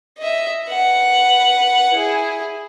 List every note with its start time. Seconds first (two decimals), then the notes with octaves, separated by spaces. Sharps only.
0.18 D#5 E5
0.68 B4 F#5
1.93 E4 G#4